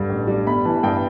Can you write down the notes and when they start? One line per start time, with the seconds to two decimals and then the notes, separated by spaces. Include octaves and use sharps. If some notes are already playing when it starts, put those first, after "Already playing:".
Already playing: G2 D3 G3
0.09 A1
0.27 G3
0.46 G1 B5
0.65 E3 A5
0.83 G2 G5